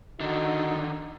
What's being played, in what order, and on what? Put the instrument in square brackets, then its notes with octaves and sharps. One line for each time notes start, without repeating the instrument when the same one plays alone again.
[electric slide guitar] D3 D#3 [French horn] D#4 [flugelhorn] F#4